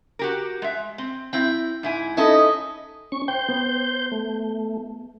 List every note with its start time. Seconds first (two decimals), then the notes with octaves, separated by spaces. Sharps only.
0.19 F#4 G4 A#4
0.62 G#3 E5
0.98 C4
1.33 C4 E4 G5
1.83 G#2 E4 G#5
2.17 C#4 D#4 E4 A4 D#5
3.12 C#4 C#6
3.28 C5 G5 G6
3.49 B3
4.12 A3